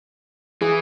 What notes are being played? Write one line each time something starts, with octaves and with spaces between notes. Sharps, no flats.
E3 G#4